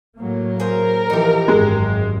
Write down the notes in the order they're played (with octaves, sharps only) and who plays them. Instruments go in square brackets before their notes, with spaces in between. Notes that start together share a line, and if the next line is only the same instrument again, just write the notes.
[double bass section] A2 F#3 A#3
[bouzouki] G#4 C5 [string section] A#4
[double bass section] E3 F3 [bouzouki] D#4 G4
[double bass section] G#1 F#2 [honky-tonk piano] G#3